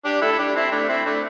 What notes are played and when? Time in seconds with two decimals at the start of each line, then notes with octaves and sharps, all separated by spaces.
0.05 D4 G4
0.22 E4 A4
0.32 E4
0.39 D4 G4
0.56 C4 E4
0.72 A3 D4
0.89 C4 E4
1.05 A3 D4